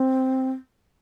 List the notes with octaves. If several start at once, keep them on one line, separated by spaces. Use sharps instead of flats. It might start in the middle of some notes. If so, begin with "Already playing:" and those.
Already playing: C4